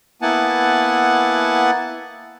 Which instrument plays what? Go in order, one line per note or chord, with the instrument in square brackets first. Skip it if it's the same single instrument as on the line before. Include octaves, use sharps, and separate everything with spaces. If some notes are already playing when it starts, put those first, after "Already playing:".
[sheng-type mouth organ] A#3 B3 E4 F#5 G#5 A5